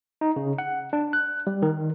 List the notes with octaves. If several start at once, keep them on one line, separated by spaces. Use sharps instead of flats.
D#4
C#3
F#5
D4
F#6
G3
D#3